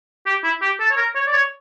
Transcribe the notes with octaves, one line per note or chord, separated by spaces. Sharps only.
G4
E4
G4
A4
C#5
A#4
C#5
D5
C#5